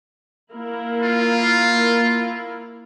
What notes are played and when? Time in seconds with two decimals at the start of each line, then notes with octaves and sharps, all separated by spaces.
0.52 A#3 E4 A#4
1.03 F4